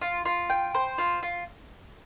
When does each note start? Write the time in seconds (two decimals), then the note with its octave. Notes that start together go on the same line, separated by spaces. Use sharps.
0.01 F4
0.25 F4
0.50 G5
0.74 C5
0.98 F4
1.23 F4